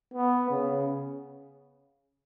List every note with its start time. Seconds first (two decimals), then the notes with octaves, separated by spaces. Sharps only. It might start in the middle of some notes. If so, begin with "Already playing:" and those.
0.14 B3
0.51 C#3